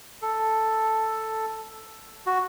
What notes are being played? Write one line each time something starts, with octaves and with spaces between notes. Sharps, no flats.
A4
F#4